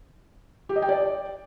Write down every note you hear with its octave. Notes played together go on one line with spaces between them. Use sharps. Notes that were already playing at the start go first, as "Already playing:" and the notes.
G4
D#5
G5
D5